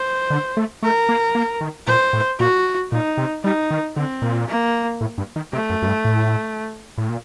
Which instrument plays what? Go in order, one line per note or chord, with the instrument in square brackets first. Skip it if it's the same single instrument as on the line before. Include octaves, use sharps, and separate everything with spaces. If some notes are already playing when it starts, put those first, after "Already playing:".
Already playing: [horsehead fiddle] C5
[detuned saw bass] D3
A3
[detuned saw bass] A3 [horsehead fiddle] A#4
[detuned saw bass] A#3
A#3
D#3
[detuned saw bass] A#2 [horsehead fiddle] C5
[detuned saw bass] A2
[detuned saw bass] A#2 [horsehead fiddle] F#4
[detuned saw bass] A#2 [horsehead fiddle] D#4
[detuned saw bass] C3
[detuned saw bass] G3 [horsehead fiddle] D#4
[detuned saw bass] D#3
[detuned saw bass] D3 [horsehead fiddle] C4
[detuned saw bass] A#2
[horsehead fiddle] A#3
[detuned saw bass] A2
G2
D#3
[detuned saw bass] C3 [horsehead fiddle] A3
[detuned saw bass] F#2
F#2
G2
A2
A2
A#2